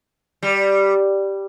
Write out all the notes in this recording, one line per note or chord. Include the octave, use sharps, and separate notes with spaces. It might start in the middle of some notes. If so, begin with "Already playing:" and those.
G3